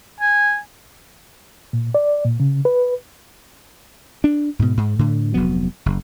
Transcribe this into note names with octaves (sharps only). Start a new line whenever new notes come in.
G#5
A#2
D5
A#2
C#3
B4
D4
G#2 B2
G#2
A2 D3
F1 D2 F#3 B3
F#1